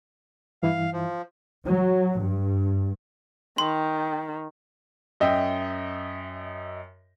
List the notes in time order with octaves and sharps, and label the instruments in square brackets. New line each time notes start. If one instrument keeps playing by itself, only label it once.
[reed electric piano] G2 E3 E4 [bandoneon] F5
[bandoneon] F3
[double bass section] F#3
G2
[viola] D#3 [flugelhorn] G5 [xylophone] C6
[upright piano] F#2 D#5 E5 G5